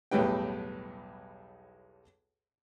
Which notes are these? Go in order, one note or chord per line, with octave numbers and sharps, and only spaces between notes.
B1 E2 A2 G3 B4 G5